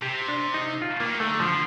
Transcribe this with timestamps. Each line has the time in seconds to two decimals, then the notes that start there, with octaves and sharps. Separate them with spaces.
0.02 C3 G4
0.28 D4
0.54 D#4
0.82 F4
1.00 D#3 A#3
1.20 D3 A3
1.40 D3 F3